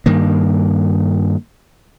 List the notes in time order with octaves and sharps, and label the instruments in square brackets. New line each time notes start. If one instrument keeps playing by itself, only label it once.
[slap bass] G2 D#3 A#3